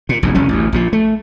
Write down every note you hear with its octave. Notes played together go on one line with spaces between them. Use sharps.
A#2
F1 A#1 E2 G2
F1 C2 D3 C#4
A1 D2
A#1 A#2 F3
A3